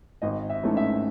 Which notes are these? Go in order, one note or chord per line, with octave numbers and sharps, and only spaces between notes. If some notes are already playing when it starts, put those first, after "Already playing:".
G#1 D#5
E5
G#2 E3 A3 C#4
E5